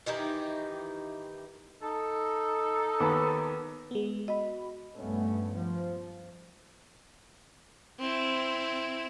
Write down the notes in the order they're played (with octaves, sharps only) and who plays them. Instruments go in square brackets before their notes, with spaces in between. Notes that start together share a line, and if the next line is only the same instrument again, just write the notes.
[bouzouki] D#3 E3 D#4 G4
[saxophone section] D#4 A4
[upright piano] D#2 B3 B5
[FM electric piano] G#3 B3
[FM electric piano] F#4 B5 [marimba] D#5
[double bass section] A#1 G2 A3 B3 C#4
F3
[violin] C4 E4